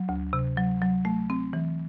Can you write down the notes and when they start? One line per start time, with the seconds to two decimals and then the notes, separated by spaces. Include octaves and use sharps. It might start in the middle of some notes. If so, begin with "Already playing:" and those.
Already playing: F#3
0.09 D2
0.33 C3
0.57 F#3
0.82 F#3
1.05 A3
1.30 C4
1.53 E3